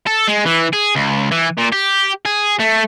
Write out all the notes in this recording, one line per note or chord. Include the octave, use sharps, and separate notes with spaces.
A4
G#3
E3
G#4
C#2
E3
A#2
G4
G#4
A3